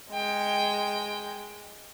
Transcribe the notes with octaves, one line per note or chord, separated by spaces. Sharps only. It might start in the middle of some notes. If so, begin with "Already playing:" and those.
G#3 G5